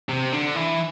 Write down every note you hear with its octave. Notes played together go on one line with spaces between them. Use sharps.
C3
D3
E3